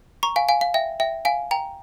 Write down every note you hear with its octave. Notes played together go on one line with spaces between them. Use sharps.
A#5 C#6
F5 G#5
F5 G#5
F5
E5 G5
E5 G5
F5 G#5
G5 A#5